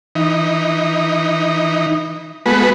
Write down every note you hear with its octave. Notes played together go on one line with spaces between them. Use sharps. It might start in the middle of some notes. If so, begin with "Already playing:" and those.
E3 D#4
G#3 A3 B3 F#4 B4